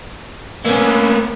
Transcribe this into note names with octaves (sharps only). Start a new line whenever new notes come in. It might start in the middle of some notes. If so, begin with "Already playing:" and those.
E3 A#3 B3 C#4